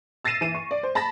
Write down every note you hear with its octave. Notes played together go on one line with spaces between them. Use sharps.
E6 A6 A#6 C7 D#7 E7
E3 D#7 E7
C#6
D5
C5
A5 B5 A6 A#6